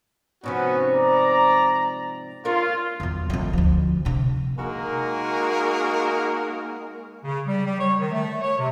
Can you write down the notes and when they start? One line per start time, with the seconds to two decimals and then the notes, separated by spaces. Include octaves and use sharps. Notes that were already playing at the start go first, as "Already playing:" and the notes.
0.44 G#2 C3 F3 B3 C#4 F#4
0.92 D5 A#5
2.45 D4 F4 A#4 C#5
3.00 E2 F#3
3.30 F2 A3
3.53 D2 F3
4.05 C3 D4
4.58 G#3 A#3 D#4 F#4 G#4 A#4
7.24 C#3
7.45 G3
7.64 G3
7.79 C#5
7.97 D#3
8.11 A3
8.41 C#5
8.58 C3